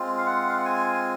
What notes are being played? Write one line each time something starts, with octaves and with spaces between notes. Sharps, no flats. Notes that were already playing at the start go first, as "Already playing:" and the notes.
Already playing: G#3 C4 F4
F5
F#5
F5
F#5
G#5